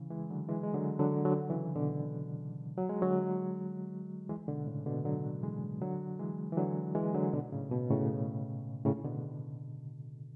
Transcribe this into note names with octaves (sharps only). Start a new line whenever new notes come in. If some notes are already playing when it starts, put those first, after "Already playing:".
Already playing: C#3 E3
E3 G#3
D3 F#3
E3 G#3
G#3
D3 F#3
D3 F#3
D3 F#3
C#3 E3
B2 D3
F#3
G#3
D3 F#3
E3 G#3
B2 D3
A2 C#3
B2 D3
D3 F#3
E3 G#3
D3 F#3
E3 G#3
E3
D3 F#3
E3 G#3
D3 F#3
B2 D3
A2 C#3
B2
A2 C#3
A2 C#3
B2 D3